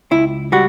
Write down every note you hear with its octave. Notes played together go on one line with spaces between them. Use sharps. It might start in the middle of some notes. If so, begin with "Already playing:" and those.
C#2 E4
G3 F#4